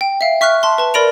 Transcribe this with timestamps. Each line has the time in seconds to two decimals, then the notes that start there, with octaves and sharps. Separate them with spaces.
0.01 G5
0.21 E5 F5
0.41 E5 C#6 F6 F#6 B6
0.63 A5 C6
0.78 B4 A5
0.94 A#4 D5 B5 A#6 D7 F7